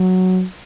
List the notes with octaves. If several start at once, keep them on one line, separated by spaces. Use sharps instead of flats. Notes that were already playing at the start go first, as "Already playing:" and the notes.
Already playing: F#3